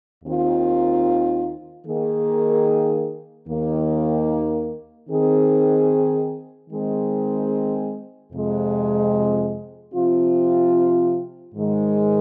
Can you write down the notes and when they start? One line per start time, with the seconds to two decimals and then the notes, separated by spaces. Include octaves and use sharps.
0.24 D#2 D#3 C4 F4
1.86 D#3 A#3 G#4
3.48 D#2 D#3 A#3
5.09 D#3 C4 G#4
6.70 D#3 G#3 C4 G#4
8.32 F2 C3 G#3
9.93 C3 F3 C4 F4
11.55 G#2 D#3 G#3